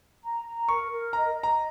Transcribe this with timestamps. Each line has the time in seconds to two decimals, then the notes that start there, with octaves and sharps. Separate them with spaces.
0.23 A#5
0.45 A#5
0.68 A#4 C#6
0.91 A#4
1.13 D#5 A#5
1.36 D#5
1.43 A#5